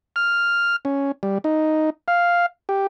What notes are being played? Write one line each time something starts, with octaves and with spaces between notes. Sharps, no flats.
F6
C#4
G3
D#4
F5
G4